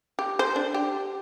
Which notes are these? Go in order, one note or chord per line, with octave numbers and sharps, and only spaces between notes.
G4
C5
D4
G4